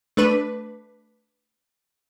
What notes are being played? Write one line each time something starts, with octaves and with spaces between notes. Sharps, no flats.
A3 D4 B4